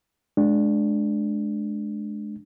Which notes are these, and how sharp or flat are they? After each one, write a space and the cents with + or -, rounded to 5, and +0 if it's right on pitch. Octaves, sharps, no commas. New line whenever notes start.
G#3 +30 D4 +0